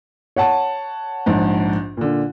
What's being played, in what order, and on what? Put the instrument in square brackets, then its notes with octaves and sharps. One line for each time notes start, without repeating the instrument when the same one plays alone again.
[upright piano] C#5 F#5 A5
[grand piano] A#1 G#2
A#2 D3